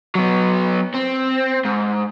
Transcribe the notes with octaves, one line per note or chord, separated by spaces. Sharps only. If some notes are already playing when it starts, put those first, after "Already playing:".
F#3 B3
C4
G#2